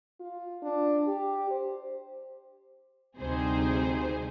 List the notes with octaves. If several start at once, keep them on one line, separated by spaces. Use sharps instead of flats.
F4
D4
G4
C5
D2 C3 G3 D#4 G#4 C5